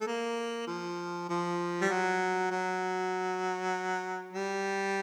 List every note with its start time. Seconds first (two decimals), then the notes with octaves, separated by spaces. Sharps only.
0.01 A3
0.07 A#3
0.67 F3
1.29 F3
1.82 G3
1.89 F#3
2.51 F#3
4.33 G3